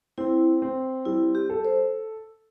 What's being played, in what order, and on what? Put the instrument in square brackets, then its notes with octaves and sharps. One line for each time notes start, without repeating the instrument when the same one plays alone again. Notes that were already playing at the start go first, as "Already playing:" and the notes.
[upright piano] C4 [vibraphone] E4
[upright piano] C4
[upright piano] G3 [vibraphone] E4
[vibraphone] G4
[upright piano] A4
[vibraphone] C5